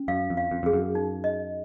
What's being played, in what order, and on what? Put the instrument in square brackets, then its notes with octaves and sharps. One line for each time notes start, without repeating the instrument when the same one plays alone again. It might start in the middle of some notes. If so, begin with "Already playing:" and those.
Already playing: [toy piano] C#4
[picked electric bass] F#2 [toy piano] F5
[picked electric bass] F2
[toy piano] F5
[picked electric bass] F2
[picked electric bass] F2 [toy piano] G#4
[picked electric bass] F#2
[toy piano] D#4
D#5